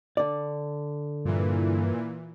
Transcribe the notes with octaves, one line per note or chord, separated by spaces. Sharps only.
D3 D5
G2 A#2 E3